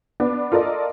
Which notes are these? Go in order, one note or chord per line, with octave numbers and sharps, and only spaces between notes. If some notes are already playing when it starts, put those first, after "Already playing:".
B3 D4
F4 A4 A#4 D5 D#5